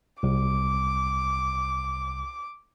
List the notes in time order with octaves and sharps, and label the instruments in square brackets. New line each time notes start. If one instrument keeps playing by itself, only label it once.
[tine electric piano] C2 [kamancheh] D6